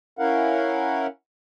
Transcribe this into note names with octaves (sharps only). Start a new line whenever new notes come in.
C#4 E4 A#4 F5 F#5